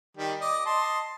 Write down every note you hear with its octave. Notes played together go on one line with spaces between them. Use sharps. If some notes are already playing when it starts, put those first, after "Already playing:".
D#3 G3 G4
D5 D#5 D6
D#5 A5 C6